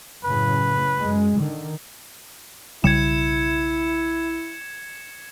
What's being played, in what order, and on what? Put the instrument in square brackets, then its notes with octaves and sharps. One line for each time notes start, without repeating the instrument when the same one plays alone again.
[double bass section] F#2 A2 C#3 [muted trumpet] B4
[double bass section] F#2 G#3
D3 D#3
[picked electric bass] B1 C#3 G3 [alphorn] E4 [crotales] G#6 C#7 E7